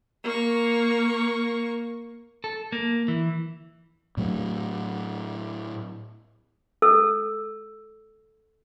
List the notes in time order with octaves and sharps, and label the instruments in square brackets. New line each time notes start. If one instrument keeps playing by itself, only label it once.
[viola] A#3 C#6
[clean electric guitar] A4
A#3
E3
[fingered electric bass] A2 F#3
[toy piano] A4 E6